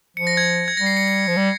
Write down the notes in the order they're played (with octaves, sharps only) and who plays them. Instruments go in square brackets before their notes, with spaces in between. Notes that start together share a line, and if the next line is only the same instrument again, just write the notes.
[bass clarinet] F3 [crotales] C#7
[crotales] A#6
G#6
G#6
[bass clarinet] G3 [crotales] A#6
[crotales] C7
C#7
C#7
[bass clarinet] F3
G3